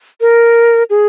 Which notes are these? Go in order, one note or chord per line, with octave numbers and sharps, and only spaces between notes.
A#4
G#4